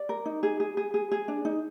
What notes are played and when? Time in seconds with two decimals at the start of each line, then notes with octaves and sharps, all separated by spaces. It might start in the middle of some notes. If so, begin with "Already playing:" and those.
Already playing: D5
0.09 A#4
0.26 D#4
0.43 G#4
0.60 G#4
0.77 G#4
0.94 G#4
1.11 G#4
1.28 D4
1.45 D#4